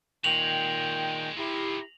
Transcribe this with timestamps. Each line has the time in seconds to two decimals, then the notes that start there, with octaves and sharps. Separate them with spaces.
0.24 A#2 D#3 G#3 F#4 G5 F7 F#7
1.38 D#3 E4 F4 G4